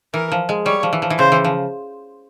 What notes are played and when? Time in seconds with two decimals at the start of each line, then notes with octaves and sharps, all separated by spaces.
0.14 E3 A#4
0.32 F3
0.49 G#3
0.66 G3 C#5
0.83 F3
0.93 E3
1.02 F3
1.10 E3
1.19 C#3 C5
1.32 E3
1.44 F3